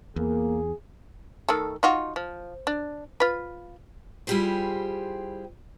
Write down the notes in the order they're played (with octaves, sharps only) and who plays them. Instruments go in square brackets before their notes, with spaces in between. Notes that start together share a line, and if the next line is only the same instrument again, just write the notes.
[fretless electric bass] E2 [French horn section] A#3 [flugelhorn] G#4
[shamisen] D#3 A3 A4
D#4 F4 F#4
F3
D4
F4 B4
[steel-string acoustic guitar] G3 E4 F4 G4 G#4 C5